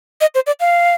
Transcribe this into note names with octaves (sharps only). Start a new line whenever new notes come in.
D#5
C5
D5
F5